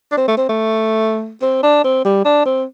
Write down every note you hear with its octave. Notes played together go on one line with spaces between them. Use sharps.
D4
C4
A3
C4
A3
C4
D4
C4
G3
D4
C4